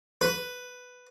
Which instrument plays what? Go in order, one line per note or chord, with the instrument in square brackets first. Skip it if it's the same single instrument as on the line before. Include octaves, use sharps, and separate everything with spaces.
[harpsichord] B4